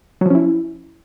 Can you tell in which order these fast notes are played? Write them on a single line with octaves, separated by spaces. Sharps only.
F#3 F3 C#4 E4